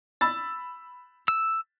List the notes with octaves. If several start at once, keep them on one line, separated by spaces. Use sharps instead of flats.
B5 E6 A6
E6